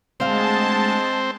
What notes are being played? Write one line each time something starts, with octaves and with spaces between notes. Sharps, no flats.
D2 G#3 C4 F5 A5